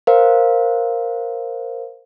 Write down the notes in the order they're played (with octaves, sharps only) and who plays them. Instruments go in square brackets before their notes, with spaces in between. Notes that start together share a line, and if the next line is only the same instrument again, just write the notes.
[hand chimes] A#4 C5 F5